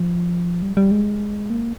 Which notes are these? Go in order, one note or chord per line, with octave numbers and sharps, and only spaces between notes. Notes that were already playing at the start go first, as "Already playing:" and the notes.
Already playing: F3
G3
G3
G#3
A#3